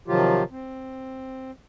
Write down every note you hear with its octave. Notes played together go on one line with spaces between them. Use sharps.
C3 D#3 F3 F#3 F4 G4
C4